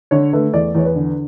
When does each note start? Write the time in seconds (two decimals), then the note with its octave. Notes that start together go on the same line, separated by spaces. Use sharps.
0.11 D3 C#5
0.33 A3 B4
0.53 E2 D5
0.75 E2 C#5
0.85 B4
0.96 D3